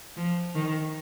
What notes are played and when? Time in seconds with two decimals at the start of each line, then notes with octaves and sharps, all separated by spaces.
0.17 F3
0.55 D#3